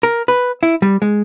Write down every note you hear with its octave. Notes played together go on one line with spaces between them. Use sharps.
A#4
B4
E4
G3
G#3